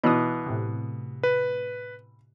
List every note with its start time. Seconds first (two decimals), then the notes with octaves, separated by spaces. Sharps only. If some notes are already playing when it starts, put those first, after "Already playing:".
0.04 B2 E3 D#6 F#6
0.46 A2 C3
1.23 B4